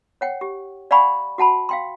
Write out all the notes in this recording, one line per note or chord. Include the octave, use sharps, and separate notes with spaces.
C#5 F#5 G5
G4
D5 F5 F#5 G#5 B5 C#6
F#4 F#5 A5 B5
F5 G5 C6